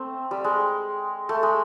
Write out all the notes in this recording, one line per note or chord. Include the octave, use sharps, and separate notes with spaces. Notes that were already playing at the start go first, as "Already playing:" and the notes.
Already playing: A3 C4
G3
G#3
A3
G#3